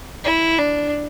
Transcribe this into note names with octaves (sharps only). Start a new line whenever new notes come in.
E4
D4